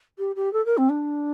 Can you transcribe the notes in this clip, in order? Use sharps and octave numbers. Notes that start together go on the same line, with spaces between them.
G4
G4
A4
A#4
C4
D4